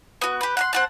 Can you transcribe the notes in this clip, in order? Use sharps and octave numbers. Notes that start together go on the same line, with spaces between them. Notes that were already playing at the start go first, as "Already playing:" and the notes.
B3 F#4
G4 B4
F#5 A5 C6
C4 F#5 A5